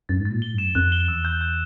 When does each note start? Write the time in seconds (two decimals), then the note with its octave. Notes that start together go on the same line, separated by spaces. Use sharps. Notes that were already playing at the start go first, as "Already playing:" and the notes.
0.09 F#2 A6
0.20 G#2
0.25 A6
0.31 A#2
0.42 A2 G7
0.54 G2 E7
0.64 F#2
0.75 F2 F#6
0.92 G7
1.08 E2 E6
1.25 G6
1.41 G6